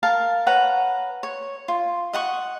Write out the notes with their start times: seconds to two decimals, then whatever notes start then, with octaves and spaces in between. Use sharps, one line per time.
0.03 A#4 F5 A5
0.47 B4 C#5 F#5 A#5
1.23 C#5
1.68 F4
2.13 D#5 F#5 C#6